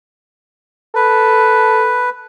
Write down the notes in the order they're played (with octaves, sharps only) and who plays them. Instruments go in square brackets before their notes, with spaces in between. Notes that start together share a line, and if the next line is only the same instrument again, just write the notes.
[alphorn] A4 [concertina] B4